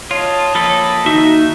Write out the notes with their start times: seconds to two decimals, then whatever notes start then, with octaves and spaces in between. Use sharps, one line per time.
0.11 F4 C#5 D#5 A5
0.55 F3 A#3 A4 B5
1.05 D#2 D#4 F#4 E5